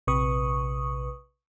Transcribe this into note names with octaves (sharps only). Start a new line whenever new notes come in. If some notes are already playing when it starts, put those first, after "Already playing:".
A#1 C3 B4 C#6 D#6